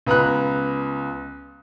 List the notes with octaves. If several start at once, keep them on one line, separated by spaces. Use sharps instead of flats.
C#2 B3 A#5 B5 F#6